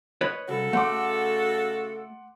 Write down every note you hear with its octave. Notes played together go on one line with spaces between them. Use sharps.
B4 C#5 D#5
C2 C#3 F#4 A4
A3 F#5 C6 D6